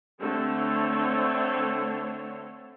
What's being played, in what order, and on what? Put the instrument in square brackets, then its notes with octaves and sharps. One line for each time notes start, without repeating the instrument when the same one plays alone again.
[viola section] D3 A3 C4 A4 C#5